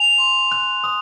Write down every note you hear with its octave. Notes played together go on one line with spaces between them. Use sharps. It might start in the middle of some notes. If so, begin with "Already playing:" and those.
Already playing: G#5 F7
C6
F#6
D#6